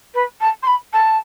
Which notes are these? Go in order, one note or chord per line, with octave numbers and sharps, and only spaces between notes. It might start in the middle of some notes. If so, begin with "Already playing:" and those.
B4
A5
C6
B5
A5